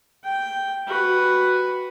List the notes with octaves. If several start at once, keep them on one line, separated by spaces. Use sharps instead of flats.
G5
F#4 B4